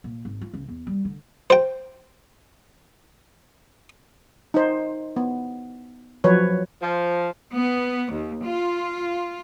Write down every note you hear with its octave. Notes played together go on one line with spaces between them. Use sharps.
A#2
G#1
F4
C#2
E2
G3
D3
C5 G5
D#4 C5
B3
F3 F#3 B4 C#5
F3
B3
D#2
F4